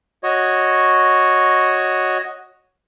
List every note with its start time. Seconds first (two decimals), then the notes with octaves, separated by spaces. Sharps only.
0.23 F#4 C#5 D#5